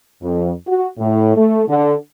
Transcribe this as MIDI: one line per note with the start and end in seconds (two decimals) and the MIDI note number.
0.23 0.51 41
0.67 0.87 66
0.99 1.33 45
1.36 1.63 57
1.69 1.95 50